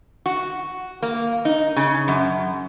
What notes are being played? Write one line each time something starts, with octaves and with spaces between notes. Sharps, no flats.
F#4
A#3
D#4
C#3
F#2